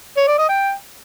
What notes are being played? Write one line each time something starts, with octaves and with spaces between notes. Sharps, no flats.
C#5
D5
D#5
G5